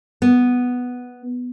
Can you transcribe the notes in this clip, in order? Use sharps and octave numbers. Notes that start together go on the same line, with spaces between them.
B3